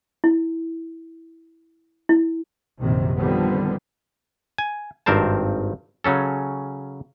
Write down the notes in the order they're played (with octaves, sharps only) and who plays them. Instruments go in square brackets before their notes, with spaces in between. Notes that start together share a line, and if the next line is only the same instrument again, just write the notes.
[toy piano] E4
E4
[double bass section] A#1 F#2 C3 D#3
D3 D#3 F3 G3 B3 C4
[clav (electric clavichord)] G#5
G#1 G2 C4 A#4 C5 A5
C#3 F#3 C#4 A4